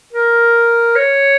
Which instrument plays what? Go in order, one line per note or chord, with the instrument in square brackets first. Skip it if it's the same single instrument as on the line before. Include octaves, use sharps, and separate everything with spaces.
[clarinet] A#4
C#5